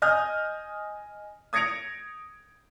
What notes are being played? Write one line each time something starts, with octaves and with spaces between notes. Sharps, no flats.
D#5 G#5 D#6 F6 G6
D#6 G#6 A#6 C#7 D7 F7